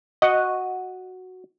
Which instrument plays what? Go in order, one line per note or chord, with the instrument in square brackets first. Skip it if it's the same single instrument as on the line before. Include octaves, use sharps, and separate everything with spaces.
[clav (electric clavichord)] F#4 F#5 [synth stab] D#5